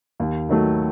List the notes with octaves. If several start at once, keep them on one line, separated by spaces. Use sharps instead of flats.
D#2
D#3 F#3 A3